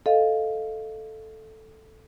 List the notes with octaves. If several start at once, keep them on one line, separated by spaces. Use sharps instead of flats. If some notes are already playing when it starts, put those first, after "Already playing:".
A4 D#5 F5